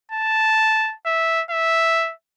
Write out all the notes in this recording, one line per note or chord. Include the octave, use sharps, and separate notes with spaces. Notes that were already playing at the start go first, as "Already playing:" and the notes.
A5
E5
E5